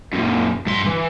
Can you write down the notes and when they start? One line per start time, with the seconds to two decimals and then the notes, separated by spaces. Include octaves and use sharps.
0.13 F#2 A#2
0.67 G2 C6
0.86 E3